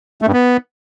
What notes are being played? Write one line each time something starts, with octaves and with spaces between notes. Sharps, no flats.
A3
G2
B3